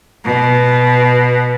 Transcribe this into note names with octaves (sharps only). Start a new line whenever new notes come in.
B2